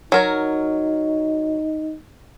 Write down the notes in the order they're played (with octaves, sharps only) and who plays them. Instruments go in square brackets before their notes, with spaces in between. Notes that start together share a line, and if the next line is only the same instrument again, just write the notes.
[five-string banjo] F#3 A#4 C#5 [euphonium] D#4